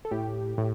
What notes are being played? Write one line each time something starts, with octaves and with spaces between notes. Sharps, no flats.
A4
A2 G4
A2